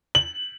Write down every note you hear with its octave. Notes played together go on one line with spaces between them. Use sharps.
F#7